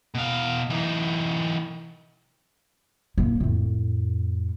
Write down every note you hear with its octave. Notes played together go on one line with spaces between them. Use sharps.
B2 F5
E3 D#4
A2 A#3
F2 A2